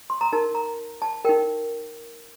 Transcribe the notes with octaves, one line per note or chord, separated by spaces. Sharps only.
C6
A#5
D#4 A#4 A5
A#5
A5
D#4 A#4 G5